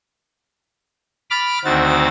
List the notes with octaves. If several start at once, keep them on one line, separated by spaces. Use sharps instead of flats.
B5 D6 F6 A6
D2 D#3 C4 F#4 A6